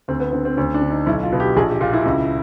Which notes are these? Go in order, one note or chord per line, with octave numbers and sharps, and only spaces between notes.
D2 C4
B3
D3 C4
C4
D2 C#4
D4
D3
D#4
B1 E4
F4
B2
G4
A#1 G#4
G4
A#2 F4
E4
C#2